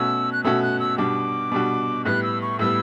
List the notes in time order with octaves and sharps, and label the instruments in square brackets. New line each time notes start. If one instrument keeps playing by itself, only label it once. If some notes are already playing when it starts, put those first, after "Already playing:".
Already playing: [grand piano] B2 A3 C#4 F#4 [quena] E6
[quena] F#6
[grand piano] B2 A3 C#4 F#4 [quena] E6
[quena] F#6
E6
[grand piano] B2 G3 D4 F#4 [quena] D6
[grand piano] B2 G3 D4 F#4
[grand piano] A2 G3 B3 [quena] F#6
[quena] E6
C#6
[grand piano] A2 G3 B3 [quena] E6